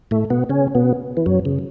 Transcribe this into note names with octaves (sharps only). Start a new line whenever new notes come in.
A2 A3
B2 B3
C#3 C#4
B2 B3
E3
F#2 F#3
C#3